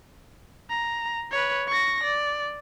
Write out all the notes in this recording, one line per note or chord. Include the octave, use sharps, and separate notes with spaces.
A#5
B4 C#5
C#6 A#6
D5